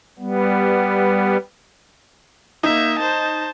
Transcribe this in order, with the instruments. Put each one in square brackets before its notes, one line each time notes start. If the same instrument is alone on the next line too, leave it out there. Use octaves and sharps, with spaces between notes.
[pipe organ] G3 B3
[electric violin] A#3 E5 [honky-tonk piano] D#4
[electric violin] C5 A5